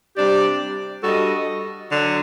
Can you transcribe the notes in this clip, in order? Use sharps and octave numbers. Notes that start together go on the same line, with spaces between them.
C3 G3 D4 G4 D5
G3 D4 F#4 A4 D#5
D3 F#3